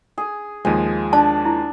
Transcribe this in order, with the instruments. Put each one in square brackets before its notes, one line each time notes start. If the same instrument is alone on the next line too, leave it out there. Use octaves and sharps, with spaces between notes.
[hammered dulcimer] G#4
[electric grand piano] D#2 F3 G#3 [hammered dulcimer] G#5
[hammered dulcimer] D4 [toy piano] A5
[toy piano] E4